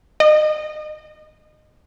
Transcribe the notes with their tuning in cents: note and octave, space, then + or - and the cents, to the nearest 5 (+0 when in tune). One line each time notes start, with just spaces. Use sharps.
D#5 -15